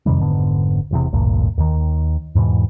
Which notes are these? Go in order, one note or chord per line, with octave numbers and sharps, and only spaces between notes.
F2 C3 D#3 G3
F1 G#2 D3 B3
E1 E2 C3
A1 D2 G2 A#2
D#2 D#3
E2 G#2 B2 E3